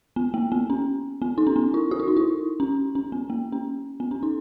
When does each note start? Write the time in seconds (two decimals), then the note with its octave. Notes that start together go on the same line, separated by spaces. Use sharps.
0.16 B3
0.34 A#3
0.52 B3
0.70 C#4
1.22 B3
1.38 D#4
1.47 C#4
1.56 B3
1.74 E4
1.91 F#4
2.00 E4
2.08 D#4
2.17 E4
2.60 C#4
2.95 C#4
3.12 B3
3.30 A#3
3.52 C#4
4.00 B3
4.11 C#4
4.23 D#4